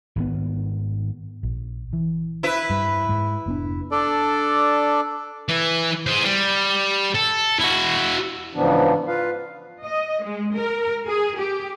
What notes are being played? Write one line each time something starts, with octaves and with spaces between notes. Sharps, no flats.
G#1 D#3 B3
A#1
E3
E4 B4
G2 G3
G#2 G#3
F1 B3 D4
D4 A4 D5
E3
G#4 C5
G3
A4
E4 F#4
G#2 C#3 E3 F3 B3 D4
F4 B4 F5
D#5
G#3
A#4
G#4
G4